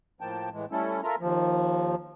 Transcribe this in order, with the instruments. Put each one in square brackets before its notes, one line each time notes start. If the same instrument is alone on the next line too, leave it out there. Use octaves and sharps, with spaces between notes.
[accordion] A2 F3 A#3 G5 A5
A2 E3 G#3
G3 A3 C#4 E4 A4
F4 A4 A#4 E5 A#5
D#2 F3